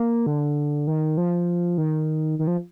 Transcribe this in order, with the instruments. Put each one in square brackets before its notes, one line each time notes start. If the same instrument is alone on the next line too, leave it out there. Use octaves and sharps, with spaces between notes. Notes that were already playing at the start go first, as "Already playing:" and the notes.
Already playing: [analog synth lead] A#3
D3
D#3
F3
D#3
D#3
F3